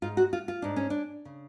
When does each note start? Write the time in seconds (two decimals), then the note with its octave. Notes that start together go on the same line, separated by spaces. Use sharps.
0.02 G#2 F4
0.17 F#4
0.33 F4
0.48 F4
0.62 G#2 D4
0.76 C#4
0.90 D4
1.25 C#3